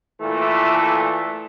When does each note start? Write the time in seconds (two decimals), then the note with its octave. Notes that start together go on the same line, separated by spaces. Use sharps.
0.20 A#2 E3 A3